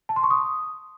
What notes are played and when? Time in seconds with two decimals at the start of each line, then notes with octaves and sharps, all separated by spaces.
0.09 A5
0.16 C6
0.23 C#6
0.31 D#6